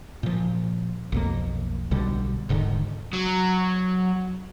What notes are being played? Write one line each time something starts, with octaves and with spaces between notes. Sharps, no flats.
A#2 F3
B1 F2 A#3
B1 B2 D3 G3
E1 G#2 D3 D#3
F#3